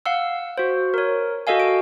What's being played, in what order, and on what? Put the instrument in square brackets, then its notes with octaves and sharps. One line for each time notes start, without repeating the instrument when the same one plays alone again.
[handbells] F5 F#5 E6
F#4 C5
A#4 C#5
F#4 A4 D#5 F5 G#5
D7